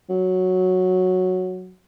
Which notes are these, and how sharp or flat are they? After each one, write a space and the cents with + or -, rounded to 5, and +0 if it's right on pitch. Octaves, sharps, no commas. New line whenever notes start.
F#3 -5